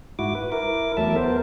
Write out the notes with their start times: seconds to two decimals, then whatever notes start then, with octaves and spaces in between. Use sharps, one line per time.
0.19 G#2 E4 F#4 D6
0.35 B4
0.52 E4 A#4 D6
0.97 E2 F#3 A3 A#4 E5 A5
1.16 B3 A#4 C5